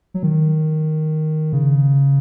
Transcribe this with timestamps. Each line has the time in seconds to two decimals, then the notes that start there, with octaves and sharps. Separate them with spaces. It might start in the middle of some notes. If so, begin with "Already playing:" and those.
0.14 F#3
0.23 D#3
1.53 C#3